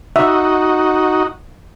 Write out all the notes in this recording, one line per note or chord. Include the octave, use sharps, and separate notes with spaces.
D#4 F#4 E5